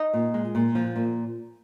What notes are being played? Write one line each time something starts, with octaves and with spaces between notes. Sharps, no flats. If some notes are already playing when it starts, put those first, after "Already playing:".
Already playing: D#4
A#2
G#3
A#2
F3
A#2